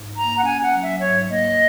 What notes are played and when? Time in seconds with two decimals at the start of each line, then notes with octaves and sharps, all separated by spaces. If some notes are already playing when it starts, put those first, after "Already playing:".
Already playing: G#2
0.17 A#3 A#5
0.38 F#5
0.44 C#4 G#5
0.63 F#5
0.74 F#3
0.83 E5
1.01 G#2 C#5
1.30 A#3 D#5